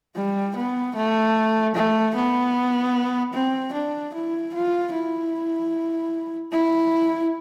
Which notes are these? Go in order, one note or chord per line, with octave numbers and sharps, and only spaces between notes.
G3
B3
A3
A3
B3
C4
D4
E4
F4
E4
E4